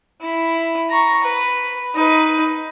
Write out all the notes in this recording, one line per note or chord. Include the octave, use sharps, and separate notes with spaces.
E4
A#5 C#6
B4
D#4 B4